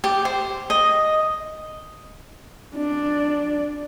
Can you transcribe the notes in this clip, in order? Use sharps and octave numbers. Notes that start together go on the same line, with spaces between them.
G4
C5
D#5
D4